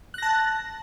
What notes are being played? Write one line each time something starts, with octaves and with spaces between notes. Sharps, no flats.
A5 F#6 A#6